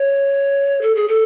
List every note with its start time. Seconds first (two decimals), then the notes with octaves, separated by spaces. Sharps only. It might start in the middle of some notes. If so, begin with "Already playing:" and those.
Already playing: C#5
0.82 A4
0.95 G#4
1.08 A4